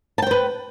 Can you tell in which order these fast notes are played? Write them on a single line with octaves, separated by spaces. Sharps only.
A5 G5 C5 B4